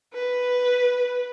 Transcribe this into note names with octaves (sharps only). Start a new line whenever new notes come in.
B4